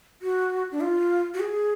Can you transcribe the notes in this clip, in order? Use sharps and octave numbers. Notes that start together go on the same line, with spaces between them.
F#4
D4
F4
F#4
G#4